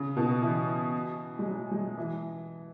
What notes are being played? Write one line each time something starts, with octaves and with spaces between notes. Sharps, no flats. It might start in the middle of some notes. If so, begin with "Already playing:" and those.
Already playing: C#3
B2
E3
G#3
F#3
G#3
E3